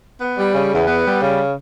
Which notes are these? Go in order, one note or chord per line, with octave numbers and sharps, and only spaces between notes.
B3
G3
C#3
E2
B3
G3
C#3